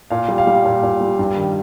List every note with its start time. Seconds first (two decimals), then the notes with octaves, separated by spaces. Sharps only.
0.10 A#2 F5
0.28 G3
0.38 F5
0.47 G3
0.65 A#2
0.83 A#2
1.01 G3
1.19 G2
1.36 D#3